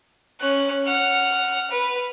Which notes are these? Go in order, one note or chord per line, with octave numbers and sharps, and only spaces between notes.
C#4 F#6
F#5 F6
B4